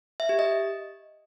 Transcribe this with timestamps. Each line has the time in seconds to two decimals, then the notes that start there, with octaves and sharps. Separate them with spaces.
0.20 E5
0.29 G4
0.39 D#5